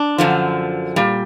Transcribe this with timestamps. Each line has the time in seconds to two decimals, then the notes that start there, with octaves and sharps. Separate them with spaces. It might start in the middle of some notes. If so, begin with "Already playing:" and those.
Already playing: D4
0.18 F#2 D3 F3
0.96 A#2 G3